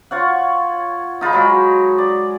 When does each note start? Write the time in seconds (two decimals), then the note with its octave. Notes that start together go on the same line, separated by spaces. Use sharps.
0.11 F4 C#5 F#5
1.21 D#4 F4 G#4 B5
1.33 F#3 G#3
1.98 D5